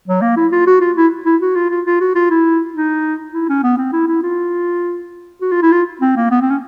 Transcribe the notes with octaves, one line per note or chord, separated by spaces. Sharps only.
F#3
A#3
E4
F4
F#4
F4
E4
E4
F#4
F4
F4
F4
F#4
F4
E4
D#4
E4
C#4
B3
C4
E4
E4
F4
F#4
F4
E4
F4
C4
A#3
B3
C4
C#4